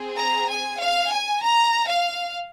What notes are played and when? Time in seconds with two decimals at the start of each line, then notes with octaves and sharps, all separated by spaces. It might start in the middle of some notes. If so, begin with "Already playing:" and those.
Already playing: C4 G#4
0.17 A#5
0.49 G#5
0.80 F5
1.10 G#5
1.42 A#5
1.88 F5